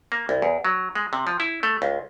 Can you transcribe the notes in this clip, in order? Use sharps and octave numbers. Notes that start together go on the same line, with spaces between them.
A#3
C2
E2
F#3
G#3
C3
F3
E4
A3
C#2